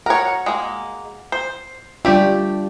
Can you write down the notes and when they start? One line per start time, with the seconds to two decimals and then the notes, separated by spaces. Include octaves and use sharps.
0.06 A#4 C#5 F#5
0.46 G#3 A#3
1.32 C5
2.05 G3 A3 D4 F4 G4 D5